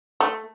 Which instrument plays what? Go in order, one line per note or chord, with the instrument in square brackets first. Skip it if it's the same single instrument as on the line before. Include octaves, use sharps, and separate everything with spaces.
[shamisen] A3